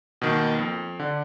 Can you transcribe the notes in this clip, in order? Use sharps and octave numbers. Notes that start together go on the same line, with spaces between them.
B2 D#3 A#3
F2
D3